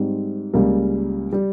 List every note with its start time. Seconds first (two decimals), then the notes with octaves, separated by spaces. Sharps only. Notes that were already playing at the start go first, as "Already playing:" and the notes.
Already playing: G#2 G3 C4
0.54 C#2 C#3 G3 A#3
1.33 G3